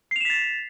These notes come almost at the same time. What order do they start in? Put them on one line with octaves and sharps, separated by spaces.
C7 F7 E7 B6 A6